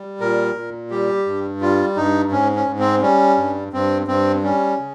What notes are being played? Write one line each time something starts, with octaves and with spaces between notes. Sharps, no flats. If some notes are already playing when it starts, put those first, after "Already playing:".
Already playing: G3
A#2 A#4
A#2
G3 G4
G2
G3 F4
G2 D#4
G#2 C#4
C#4
G#2
C4
G3 C#4
G2
G2 C4
G2 C4
G3 C#4
C#3